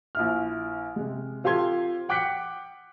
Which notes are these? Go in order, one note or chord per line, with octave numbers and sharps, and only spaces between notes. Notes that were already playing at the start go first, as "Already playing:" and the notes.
A#1 E4 F6
C3 G#3
C4 F4 G4 A4 C6 G#6
F#5 G5 D6 F#6 B6 C#7